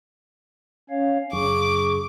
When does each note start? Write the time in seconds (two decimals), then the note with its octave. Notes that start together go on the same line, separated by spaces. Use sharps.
0.90 C#4 C#5 F5
1.33 F#1 F#2 G#4 C#6 D6